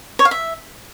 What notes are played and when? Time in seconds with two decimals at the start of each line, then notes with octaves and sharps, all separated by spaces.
0.19 C#5
0.25 F5
0.31 E5